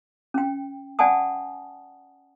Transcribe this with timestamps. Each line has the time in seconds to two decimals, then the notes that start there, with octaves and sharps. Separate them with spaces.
0.34 C#4 G5
0.99 D5 F#5 G#5 A5 D#6